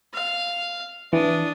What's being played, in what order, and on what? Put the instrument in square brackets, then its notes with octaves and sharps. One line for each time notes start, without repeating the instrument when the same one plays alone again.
[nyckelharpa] F5
[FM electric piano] E3 [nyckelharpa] D4 D#6